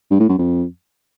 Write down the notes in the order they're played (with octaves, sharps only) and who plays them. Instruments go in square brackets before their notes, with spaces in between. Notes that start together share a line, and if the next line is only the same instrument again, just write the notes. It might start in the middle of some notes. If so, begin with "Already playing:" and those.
[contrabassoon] G2
A2
F#2
F2